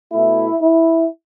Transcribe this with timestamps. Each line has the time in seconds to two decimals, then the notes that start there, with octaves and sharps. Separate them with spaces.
0.12 B2 A3 E4
0.62 E4